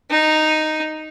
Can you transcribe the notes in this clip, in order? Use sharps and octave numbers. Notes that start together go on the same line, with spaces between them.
D#4